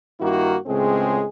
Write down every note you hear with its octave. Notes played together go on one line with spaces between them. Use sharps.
G2 D#3 A#3 E4 F#4
C#2 A2 G#3 C4 G#4